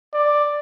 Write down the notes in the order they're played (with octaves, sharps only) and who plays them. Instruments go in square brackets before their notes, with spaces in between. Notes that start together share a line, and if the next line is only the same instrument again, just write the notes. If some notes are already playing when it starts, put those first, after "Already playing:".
[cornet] D5